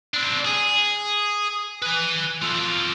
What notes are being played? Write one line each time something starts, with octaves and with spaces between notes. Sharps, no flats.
C4 D4
G#4
B4 G#5
F4 A4